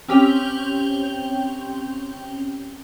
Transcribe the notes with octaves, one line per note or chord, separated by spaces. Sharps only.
C4 C#4 G4 G5 F7